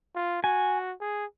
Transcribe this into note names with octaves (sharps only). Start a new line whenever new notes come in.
F4
F#4 G#5
G#4